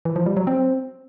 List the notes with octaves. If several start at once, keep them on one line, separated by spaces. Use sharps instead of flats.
E3
F3
G3
F#3
C4